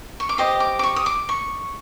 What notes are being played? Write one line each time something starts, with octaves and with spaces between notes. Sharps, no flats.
C#6
D6
G4 C5 D#5 D#6
D6
D6
C#6
D#6
D6
C#6